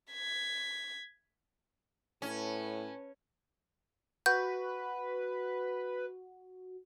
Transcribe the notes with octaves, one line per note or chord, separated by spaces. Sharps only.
G#6 B6
A2 C#4 B4 A5
F#4 B4 G6